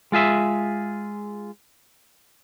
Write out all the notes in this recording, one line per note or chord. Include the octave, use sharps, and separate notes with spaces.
G#3 F4 G#4 E5